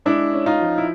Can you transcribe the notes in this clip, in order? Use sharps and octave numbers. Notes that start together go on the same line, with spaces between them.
G#3 D4 E4
C#4
D#4 F4
F3
E4